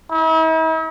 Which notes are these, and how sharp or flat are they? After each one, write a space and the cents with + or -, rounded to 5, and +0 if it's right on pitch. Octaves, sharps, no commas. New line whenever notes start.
E4 -45